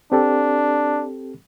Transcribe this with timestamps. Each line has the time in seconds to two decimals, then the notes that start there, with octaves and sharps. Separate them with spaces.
0.12 C4 D4 G4 A4